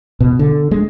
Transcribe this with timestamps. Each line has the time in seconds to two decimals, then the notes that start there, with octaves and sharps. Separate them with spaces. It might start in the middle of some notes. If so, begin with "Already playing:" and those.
0.20 B2
0.39 D3
0.71 G#3